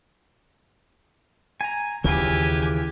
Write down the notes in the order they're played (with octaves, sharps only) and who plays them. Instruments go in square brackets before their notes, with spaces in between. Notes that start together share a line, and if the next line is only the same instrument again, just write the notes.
[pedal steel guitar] G#5 A#5
[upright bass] D#2 [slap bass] C#3 [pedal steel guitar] E3 F4 [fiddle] G4 G#5